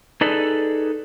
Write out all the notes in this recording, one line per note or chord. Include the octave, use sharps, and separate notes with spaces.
D#4 G#4 A4 B4 D5